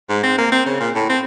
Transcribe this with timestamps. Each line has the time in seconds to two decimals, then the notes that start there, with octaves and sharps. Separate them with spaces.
0.09 G#2
0.23 C4
0.38 A#3
0.52 C4
0.66 C#3
0.80 A#2
0.95 A2
1.09 C4